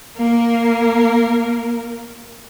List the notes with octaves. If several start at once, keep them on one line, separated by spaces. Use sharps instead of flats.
A#3 A#4